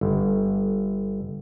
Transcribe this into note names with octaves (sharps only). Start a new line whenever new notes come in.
G1